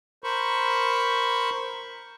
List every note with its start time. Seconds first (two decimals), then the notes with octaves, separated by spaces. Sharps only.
0.24 A#4 C5 B5 C#6